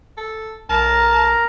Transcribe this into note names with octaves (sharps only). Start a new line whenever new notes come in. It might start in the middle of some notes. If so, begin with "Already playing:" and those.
A4
B1 A#4 A5 A#5